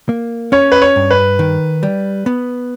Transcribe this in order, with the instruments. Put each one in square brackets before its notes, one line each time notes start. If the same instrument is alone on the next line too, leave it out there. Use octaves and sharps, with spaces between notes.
[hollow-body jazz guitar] A#3
[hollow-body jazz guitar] C#4 [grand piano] C#5
[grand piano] B4
C#5
[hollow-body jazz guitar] G2
[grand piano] B4
[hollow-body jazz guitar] D#3
G3
B3